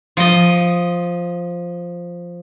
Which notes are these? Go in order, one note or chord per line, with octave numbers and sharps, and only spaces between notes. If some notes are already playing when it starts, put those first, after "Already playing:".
F3 D#5